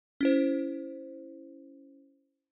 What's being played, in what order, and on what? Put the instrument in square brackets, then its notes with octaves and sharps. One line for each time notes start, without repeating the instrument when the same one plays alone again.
[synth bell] C#4 E4 C5